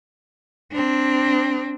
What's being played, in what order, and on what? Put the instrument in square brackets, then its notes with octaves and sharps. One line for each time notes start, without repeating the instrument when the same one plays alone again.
[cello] C4 D4